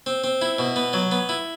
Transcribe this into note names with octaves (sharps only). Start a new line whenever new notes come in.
C4
C4
E4
B2
B3
F#3
B3
E4